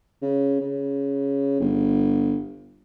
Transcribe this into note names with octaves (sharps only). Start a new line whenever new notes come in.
C#3
C#3
G1